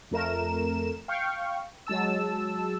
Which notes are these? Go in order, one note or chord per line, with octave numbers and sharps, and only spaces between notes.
F2 A3 A#4 E7
F5 G5 C#6
F#3 G#3 A5 E6